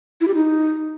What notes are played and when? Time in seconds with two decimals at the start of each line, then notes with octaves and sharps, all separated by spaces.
0.21 E4
0.28 G4
0.35 D#4